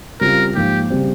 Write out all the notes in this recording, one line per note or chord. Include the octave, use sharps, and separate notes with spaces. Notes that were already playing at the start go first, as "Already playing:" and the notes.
C#3 G3 C4 F4 A#4
G#2 F3 A#3 G4
C#3 G3 C4